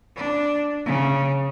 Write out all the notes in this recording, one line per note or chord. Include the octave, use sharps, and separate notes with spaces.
D4
C#3